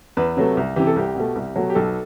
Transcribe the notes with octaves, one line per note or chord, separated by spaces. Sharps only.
E2 B4
C3 F#3 A3
C2
C3 E3 G4
A4
C2 G4
B2 A3
C2
B2 F#3 A3
G4
B1 A4